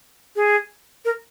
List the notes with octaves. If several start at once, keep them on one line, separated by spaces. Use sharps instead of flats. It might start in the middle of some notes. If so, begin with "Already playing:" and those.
G#4
A#4